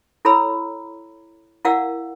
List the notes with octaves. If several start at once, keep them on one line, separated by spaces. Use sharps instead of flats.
E4 A4 C#5 A#5 B5 E6
E4 A#4 D5 F5 F#5 E6